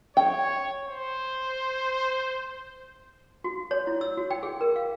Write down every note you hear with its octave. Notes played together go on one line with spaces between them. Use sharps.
C#5 G5
C5
F#4
C#5
E4
E6
F#4
G5
G#4
A#4
F5